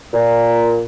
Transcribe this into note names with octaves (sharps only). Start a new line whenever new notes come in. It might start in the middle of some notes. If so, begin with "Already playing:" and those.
A#2